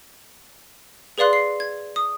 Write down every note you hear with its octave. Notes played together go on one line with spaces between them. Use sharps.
G#4 B4 D5 F5 C6 F#6
C7
G#6
D#6